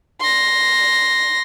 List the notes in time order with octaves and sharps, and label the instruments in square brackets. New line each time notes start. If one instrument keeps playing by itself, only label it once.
[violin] C6 A#6